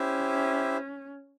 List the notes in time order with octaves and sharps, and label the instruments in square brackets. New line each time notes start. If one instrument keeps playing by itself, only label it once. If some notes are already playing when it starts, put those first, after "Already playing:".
Already playing: [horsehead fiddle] C#4 [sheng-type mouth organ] E4 G4 C5 E5